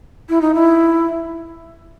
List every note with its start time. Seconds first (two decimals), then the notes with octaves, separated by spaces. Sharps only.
0.29 E4
0.42 D#4
0.55 E4